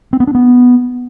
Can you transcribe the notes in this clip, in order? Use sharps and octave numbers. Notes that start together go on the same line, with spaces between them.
C4
B3
D4
B3